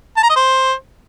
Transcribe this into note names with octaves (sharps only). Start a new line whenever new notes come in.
A5
A#5
D#5
C5